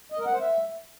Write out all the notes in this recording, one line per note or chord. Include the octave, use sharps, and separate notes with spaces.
D#5
A#4
F#5
C5
E5